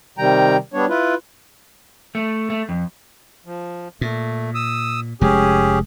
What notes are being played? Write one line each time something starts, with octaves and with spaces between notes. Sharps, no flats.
C3 D#3 G3 G5 A#5
G3 B3 D4 C#5
E4 F4 B4
A3
A3
F2
F3
A#2 A3
D#6 E6
F1 G#3 C#4 G4 G#4